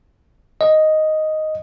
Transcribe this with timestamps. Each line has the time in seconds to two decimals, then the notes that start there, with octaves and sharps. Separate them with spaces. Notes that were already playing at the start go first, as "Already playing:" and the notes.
0.61 D#5